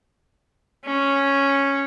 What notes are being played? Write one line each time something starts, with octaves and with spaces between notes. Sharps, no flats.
C#4